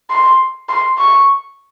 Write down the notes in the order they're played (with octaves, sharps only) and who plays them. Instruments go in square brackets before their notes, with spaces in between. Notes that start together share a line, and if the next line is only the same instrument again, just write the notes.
[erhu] C6
C6
C#6